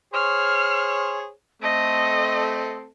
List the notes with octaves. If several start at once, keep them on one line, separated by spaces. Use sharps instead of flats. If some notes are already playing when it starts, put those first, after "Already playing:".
G#4 C5 C#5 F6
A3 C4 A4 D#5